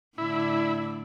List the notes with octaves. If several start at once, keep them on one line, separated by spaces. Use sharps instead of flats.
A2 D3 E4 D5